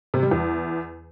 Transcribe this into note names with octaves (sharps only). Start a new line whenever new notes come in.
C3
G3
E2